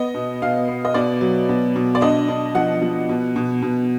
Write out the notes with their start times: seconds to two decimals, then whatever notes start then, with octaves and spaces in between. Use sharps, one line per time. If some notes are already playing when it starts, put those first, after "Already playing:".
Already playing: B3 D#5
0.14 B2
0.42 B2 F5
0.68 B3
0.85 D#5
0.94 B2 D5
1.21 F#3
1.49 B2
1.76 B2
1.95 D5
2.01 D4 D#5
2.29 D4
2.55 F3 F#5
2.82 F3
3.09 B2
3.36 B2
3.62 B2